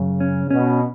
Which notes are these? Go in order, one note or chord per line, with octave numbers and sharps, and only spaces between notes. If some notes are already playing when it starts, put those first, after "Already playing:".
Already playing: F#2 C#3
C#4
B2 C#4